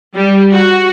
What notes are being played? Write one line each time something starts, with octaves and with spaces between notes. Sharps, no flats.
G3
F#4